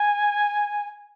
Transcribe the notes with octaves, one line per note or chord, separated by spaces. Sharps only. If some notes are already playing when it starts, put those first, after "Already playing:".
Already playing: G#5